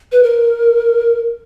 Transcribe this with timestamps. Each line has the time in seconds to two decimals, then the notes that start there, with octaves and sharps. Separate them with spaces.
0.12 B4
0.23 A#4